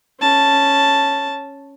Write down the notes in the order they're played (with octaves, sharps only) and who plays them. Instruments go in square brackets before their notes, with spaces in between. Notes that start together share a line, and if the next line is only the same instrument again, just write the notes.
[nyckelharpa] C#4 A5